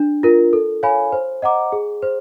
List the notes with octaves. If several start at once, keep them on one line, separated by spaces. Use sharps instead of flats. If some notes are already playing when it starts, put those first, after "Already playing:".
Already playing: D4
F4 A#4
A4
C#5 F5 G#5 B5
C5
D#5 F#5 A#5 D6
G#4
C5